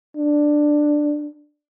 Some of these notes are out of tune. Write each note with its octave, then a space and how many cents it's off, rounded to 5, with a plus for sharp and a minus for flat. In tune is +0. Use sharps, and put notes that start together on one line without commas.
D4 +10